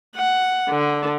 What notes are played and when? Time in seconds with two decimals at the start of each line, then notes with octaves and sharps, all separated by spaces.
0.16 F#5
0.70 D3